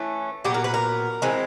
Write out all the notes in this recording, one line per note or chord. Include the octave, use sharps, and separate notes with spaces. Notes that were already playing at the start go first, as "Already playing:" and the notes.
Already playing: E3 A3 C#4
A#2 F#3 B3 G4
A#4
B4
A#4
E3 G#3 C4